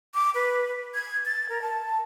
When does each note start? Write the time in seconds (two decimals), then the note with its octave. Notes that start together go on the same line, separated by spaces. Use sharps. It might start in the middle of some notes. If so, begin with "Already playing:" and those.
0.14 D6
0.35 B4
0.94 G#6
1.26 A6
1.49 A#4
1.62 A5